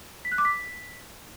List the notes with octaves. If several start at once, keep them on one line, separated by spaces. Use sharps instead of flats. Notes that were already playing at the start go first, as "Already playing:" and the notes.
B6
F#6
D6
B6